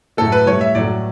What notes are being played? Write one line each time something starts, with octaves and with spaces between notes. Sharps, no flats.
A2 F#3 A3 A4
B4
A2 G3 C#5
E5
A2 F#3 A3 D5